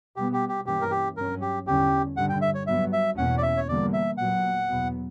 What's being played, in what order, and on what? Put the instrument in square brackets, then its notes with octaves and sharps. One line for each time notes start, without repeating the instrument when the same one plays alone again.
[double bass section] B2 G3 B3 [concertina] G4
[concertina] G4
G4
[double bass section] G2 E3 A#3 C#4 [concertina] G4
[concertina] A#4
G4
[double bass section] G2 F#3 C#4 [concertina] A#4
[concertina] G4
[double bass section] E2 D3 G3 C#4 [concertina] G4
[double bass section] G2 D3 G3 [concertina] F#5
[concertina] G5
E5
C#5
[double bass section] G2 F#3 B3 [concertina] E5
[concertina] E5
[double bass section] E2 B2 A#3 C#4 [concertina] F#5
[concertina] D5
E5
C#5
[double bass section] E2 D3 G3 A#3 [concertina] D5
[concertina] E5
[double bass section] A#2 F#3 B3 [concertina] F#5
[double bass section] E2 B2 F#3 B3